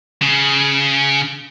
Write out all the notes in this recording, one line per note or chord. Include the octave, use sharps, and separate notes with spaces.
C#3